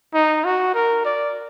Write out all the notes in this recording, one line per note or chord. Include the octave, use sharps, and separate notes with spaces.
D#4
F#4
A#4
D5